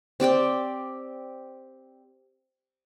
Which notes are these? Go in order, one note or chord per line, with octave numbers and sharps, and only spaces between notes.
C4 G4 D5 G5